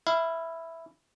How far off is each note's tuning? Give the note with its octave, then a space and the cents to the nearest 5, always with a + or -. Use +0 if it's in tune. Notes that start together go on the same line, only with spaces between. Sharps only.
E4 +0 F5 -30